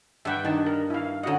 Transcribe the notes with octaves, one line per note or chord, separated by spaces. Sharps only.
G2 G3 E5 F#5 G5
D#3 D4 D#4 A5
A#4
E4 F5
D3 C#4 F#4 D#5 F#5